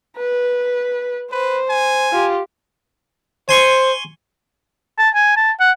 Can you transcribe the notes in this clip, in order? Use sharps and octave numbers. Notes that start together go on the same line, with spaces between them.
B4
B4 C5
G#5
F4 G4
C5 G#5 C6 C#6
A5
G#5
A5
F#5